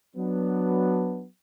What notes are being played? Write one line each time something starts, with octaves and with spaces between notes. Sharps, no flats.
F#3 B3 D4